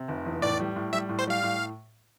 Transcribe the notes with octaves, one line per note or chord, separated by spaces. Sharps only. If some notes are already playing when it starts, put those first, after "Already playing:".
Already playing: C3
F1
E2
A2 D5
G3
A2
G3 E5
A2
C5
G3 F5
A2